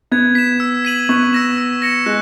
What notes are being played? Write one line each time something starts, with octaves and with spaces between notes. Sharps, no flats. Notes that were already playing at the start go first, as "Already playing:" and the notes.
B3 G#6
B6 E7
E6
B6 D#7 F#7
B3 C#6
E6 A#6 E7
E6
A#6 C#7 E7
G#3 F#6